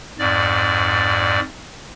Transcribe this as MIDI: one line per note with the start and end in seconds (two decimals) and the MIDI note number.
0.19 1.40 41
0.19 1.40 44
0.19 1.40 74